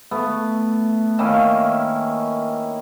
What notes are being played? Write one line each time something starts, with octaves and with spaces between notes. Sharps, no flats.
A3 B3
D#3 A#3 C#4 E4